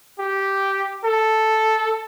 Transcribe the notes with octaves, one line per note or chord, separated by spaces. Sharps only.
G4
A4